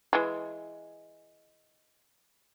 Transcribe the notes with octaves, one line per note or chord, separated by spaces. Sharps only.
E3 G#3